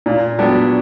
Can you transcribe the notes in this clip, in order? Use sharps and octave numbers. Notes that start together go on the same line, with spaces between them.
A#2
F#3 B3 D4 G4